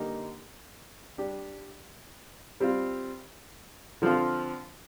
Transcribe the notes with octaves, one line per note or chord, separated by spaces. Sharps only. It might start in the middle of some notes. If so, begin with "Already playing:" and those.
Already playing: D3 G3 A#3 D#4 G4
G3 D4 G4
G3 C4 F4
D3 F3 C4 F4